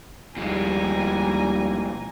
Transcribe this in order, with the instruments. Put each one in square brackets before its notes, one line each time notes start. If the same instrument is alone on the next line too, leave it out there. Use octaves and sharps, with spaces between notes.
[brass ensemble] D#2 G3 [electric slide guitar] B2 F3 G#3 [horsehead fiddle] G#5 A#5